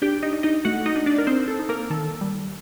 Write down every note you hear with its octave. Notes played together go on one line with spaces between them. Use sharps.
D4 G4 G5
D#4 D#5
D4
D#4 D#5
A3 F#4 F#5
D#4 D#5
D4
D4 D5
A#4
C4 D#4 C5
A4
D#4
A#3 A#4
D#3 A4
G3